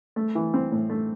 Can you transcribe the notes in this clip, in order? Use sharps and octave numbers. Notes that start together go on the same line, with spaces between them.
A3
E3
C4
A2
A3